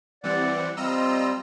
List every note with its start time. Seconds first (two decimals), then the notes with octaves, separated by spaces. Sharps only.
0.24 E3 G3 C4 D5 F#5
0.77 G3 C4 F4 D#5 A#5 E6